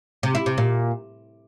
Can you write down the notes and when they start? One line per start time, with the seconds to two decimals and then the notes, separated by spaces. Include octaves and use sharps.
0.23 C3
0.35 E4
0.46 C3
0.58 A#2